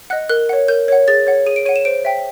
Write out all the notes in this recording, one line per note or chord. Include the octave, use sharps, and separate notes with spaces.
D#5 F#5 F#6
A#4 F#6
C#5 F#5
A#4 G6
C#5 F#5
G#4 A6
C#5 F#5
G#4 D#7
D7
C#5 F#5 D#7
E7
C5 D7
E5 G5